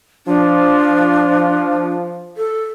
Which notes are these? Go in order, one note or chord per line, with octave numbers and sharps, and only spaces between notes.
F3 D4
A4